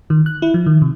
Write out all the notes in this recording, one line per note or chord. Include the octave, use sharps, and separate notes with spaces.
D#3
F#6
E4
F3
D#3
C3